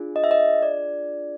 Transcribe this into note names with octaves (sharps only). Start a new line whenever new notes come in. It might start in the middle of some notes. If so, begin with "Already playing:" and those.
Already playing: D4 F4 G#4
D#5
E5
D#5
D5